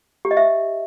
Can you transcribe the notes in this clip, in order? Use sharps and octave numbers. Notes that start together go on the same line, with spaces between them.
G4
D#5
E5